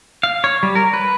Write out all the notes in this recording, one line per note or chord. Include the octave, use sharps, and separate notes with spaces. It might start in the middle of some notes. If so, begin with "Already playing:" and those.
F5
C#5
G3
A#4
B4